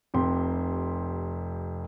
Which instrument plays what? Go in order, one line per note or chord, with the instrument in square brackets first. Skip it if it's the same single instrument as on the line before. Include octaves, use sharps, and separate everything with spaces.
[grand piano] F1 C3 G4 C6